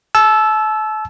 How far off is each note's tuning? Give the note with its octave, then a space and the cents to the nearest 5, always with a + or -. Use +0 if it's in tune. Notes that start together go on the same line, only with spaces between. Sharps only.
A5 -35 E6 +0